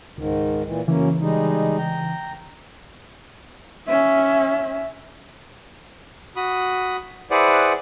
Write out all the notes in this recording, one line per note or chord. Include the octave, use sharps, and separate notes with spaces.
C#2 G#2 D#3
A#2 E3
F#2 C#3 E3 A#3 C#4
G3 G#3 D#4
G5 A#5
C#4 E5
F#4 B5 D#6
E4 G#4 B4 C5 D5 F#5